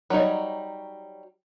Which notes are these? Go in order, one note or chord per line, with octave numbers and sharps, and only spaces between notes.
F#3 G3 D#4 C#5